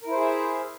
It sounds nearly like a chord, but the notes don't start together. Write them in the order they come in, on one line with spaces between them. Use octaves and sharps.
A#4 E4 C5 G#4 E5